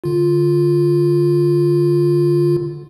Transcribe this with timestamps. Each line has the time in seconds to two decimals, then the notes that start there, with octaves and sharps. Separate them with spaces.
0.04 D3 F4